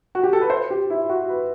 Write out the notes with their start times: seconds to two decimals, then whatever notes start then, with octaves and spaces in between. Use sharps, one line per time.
0.15 F#4
0.23 G4
0.33 A4
0.41 B4
0.50 C5
0.70 G4
0.90 E4
1.10 F#4
1.29 B4